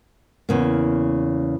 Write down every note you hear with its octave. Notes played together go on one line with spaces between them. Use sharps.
E2 C#3 A#3